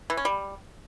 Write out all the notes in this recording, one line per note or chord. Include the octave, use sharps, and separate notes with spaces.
E3
C#4
G3